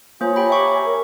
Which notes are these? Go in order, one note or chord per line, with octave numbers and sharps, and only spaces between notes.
A#3 F4 C5 C#5 G#5 A#5
G4 G5 B5
E5 C#6 D6
A#4